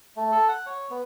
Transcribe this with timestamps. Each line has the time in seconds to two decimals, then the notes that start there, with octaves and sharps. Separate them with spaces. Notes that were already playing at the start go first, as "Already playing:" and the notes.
0.17 A3
0.32 A4
0.48 F#5
0.66 C#5
0.91 B3